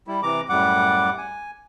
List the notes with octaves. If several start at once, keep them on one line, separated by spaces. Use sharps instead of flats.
G3 E4
C3 E3 A#5 D6
F#2 A2 G3 F#5 D6
G#5